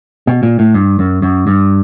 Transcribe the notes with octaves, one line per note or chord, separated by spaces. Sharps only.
B2
A#2
A2
G2
F#2
F#2
G2